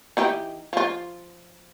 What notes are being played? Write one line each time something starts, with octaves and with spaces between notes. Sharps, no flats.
E3 D#4 G4
F3 F4